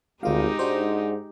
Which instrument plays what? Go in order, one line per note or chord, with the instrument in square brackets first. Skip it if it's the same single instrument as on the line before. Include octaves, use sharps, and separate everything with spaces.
[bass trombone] G#1 [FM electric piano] D2 F4 F5 [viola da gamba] G#3 D#4 G4
[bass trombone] G#2 [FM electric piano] D4 F#4 C5